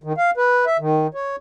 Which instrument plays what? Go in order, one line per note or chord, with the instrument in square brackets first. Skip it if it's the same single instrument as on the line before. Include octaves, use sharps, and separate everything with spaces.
[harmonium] D#3
F5
B4
E5
D#3
C#5